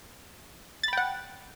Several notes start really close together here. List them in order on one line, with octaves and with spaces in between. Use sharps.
A6 B5 G5 F#5